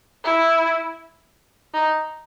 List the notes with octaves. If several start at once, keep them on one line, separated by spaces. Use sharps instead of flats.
E4
D#4